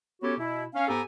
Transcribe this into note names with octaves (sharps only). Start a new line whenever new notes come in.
B3 C#4 F#4 G4 A4 C#5
B2 E4
C#4 F5
G#2 B3 G4 A4 G#5 A#5